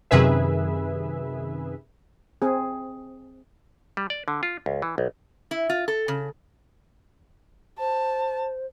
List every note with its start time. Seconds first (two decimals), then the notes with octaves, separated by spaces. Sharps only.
0.11 F#2 C3 D#3 G#4 B4 E5
2.42 C4 G#4
3.97 G3
4.10 D5
4.28 D3
4.43 F4
4.66 C#2
4.82 E3
4.98 B1
5.51 E4
5.70 F4
5.88 A4
6.08 C#3
7.79 C5 A5